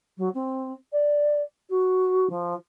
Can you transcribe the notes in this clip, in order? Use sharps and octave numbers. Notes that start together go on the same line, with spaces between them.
F#3
C4
D5
F#4
F3